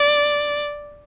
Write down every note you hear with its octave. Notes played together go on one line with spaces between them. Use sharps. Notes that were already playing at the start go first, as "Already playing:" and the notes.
Already playing: D5